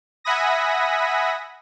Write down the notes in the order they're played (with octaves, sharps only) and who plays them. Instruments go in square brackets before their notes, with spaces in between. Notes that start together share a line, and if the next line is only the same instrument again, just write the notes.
[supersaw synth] E5 F#5 G#5 B5 D#6 A#6